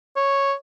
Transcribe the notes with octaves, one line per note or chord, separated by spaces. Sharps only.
C#5